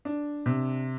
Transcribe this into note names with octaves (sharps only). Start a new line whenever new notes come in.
D4
C3